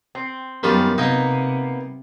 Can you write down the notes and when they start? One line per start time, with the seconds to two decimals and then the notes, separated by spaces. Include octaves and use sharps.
0.15 C4
0.63 F#2 D#3 G3 B3 F4
0.98 C3 A#3 B3 D#4 D#5 G5